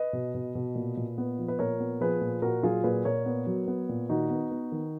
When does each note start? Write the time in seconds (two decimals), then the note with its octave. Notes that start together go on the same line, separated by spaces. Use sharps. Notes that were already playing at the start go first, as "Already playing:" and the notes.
Already playing: B4 D#5
0.13 B2
0.35 B2
0.55 B2
0.75 A#2
0.97 A#2
1.18 B3
1.39 F3
1.48 B4
1.59 A#2 A#4 C#5
1.80 B3
2.01 F3 G#4 B4
2.21 A#2
2.42 A#2 F#4 A#4
2.63 F#3 F4 G#4
2.84 A#2 G#4 B4
3.05 A#2 A#4 C#5
3.26 B3
3.47 F#3
3.68 B3
3.89 A#2
4.09 D#3 D#4 F#4
4.30 B3
4.51 B3
4.72 D#3